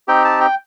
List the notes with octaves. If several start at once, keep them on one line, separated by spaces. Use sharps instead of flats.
C4 D#4 G4 G5
A5
G5